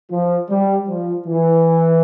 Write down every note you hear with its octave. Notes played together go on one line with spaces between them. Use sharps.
F3
G3
F3
E3